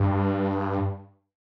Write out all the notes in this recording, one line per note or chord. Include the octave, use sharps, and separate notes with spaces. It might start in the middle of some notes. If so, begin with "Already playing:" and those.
Already playing: G2